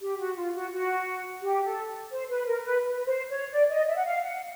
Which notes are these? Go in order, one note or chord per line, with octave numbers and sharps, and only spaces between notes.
G4
F#4
F4
F#4
F#4
G4
A4
C5
B4
A#4
B4
B4
C5
C#5
D5
D#5
E5
F#5
F5
F#5